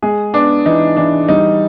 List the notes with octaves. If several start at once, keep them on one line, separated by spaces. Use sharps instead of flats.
G#3 G#4
B3 D4
E3 D#4
E3 D4
G3 D#4